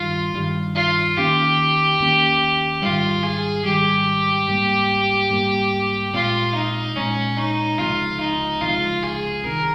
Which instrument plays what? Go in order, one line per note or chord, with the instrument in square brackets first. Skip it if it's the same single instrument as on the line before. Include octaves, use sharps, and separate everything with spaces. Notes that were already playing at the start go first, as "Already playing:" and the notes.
Already playing: [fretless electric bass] G2 D#3 G3 [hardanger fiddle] F4
[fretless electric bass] G2 D#3 G3
[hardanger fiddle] F4
[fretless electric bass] D#2 D#3 A#3 C#4 [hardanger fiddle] G4
[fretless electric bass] D#2 D#3 A#3 C#4
[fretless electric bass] G#2 D#3 G3 [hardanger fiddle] F4
[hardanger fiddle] G#4
[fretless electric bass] G#2 D#3 G3 [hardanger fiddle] G4
[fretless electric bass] G#2 G3 A#3
G#2 G3 A#3
[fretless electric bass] A#2 G#3 C4 [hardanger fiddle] F4
[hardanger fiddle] D#4
[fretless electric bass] A#2 G#3 C4 [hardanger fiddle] C#4
[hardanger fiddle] D#4
[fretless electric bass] C#2 C3 F3 G#3 [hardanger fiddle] F4
[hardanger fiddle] D#4
[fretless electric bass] C#2 C3 F3 G#3 [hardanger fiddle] F4
[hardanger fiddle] G#4
[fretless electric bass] C2 C3 D#3 [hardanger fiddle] A#4